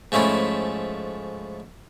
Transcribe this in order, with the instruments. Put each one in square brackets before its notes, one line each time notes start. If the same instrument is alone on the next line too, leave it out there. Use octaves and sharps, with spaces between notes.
[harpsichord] G#2 F3 A3 C#4 E4